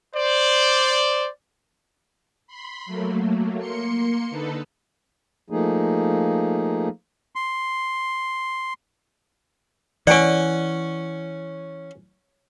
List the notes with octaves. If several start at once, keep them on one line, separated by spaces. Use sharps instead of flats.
C5 D5
B5 C6
F#3 A3 A#3
A#3 C6 C#7
D3 D#4 A4 B4
F3 A3 A#3 D#4 G#4
C6
E3 C#4 D5 F#5 G#5